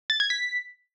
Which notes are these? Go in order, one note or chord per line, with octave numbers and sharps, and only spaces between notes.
A6
G#6
B6